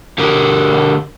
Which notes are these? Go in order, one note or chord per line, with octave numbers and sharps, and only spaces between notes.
D3 G4 A#4